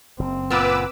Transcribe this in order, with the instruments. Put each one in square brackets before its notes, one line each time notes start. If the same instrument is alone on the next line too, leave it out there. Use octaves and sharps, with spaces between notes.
[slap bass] F#1 [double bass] C4
[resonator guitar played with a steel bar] A#2 B3 [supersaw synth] B4 D6 E6